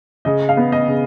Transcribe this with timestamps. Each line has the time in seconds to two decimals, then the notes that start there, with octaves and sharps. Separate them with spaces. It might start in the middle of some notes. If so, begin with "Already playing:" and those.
0.25 C#3 D#5
0.49 F5
0.57 B3
0.72 D#5
0.88 C#3